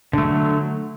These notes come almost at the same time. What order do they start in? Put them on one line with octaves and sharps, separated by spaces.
D3 A3 F#3